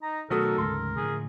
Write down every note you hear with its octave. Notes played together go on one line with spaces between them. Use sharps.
D#4 A#5
B2 D#3 F#3 A3 A4 A#4 D#6
D2 G#2 C#3 A#4 C6
A2 D3 F3 G#4